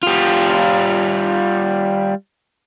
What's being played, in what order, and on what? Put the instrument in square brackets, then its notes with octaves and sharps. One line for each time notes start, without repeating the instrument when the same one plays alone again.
[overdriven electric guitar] G3 F4